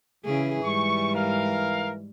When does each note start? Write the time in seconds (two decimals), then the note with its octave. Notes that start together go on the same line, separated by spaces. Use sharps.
0.25 C#3 E3 E4 G#4
0.64 G#2 G3 C#6
1.15 A#4 F5